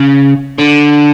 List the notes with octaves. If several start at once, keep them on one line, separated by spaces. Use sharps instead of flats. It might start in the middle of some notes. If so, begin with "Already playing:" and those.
Already playing: C#3
D3